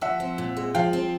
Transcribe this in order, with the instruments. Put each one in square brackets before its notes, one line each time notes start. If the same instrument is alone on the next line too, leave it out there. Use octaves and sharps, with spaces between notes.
[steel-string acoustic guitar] F3 [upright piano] E5 F#5
[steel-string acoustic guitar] C4
A#2
G#3
[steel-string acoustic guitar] F3 [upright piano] F5 G5
[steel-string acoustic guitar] C4